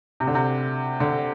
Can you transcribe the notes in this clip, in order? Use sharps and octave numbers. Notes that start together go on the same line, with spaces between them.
C3
D3
C3
D3